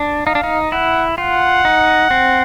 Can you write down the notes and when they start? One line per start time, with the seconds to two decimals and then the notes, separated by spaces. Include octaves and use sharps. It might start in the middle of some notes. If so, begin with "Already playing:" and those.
Already playing: D4
0.26 D#4 F5
0.35 D4
0.44 D#4
0.72 E4 F#5
1.18 F4 F#5
1.65 D#4
2.11 C4